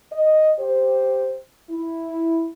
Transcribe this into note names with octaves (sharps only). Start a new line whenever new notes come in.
D#5
G4 C5
E4